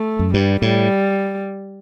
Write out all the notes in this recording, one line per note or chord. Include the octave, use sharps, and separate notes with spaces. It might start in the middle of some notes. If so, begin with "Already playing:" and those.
Already playing: A3
F#2
G2 G3
A2 G3